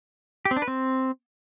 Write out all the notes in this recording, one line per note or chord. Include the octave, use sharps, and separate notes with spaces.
G4
C4
D4
B4
C4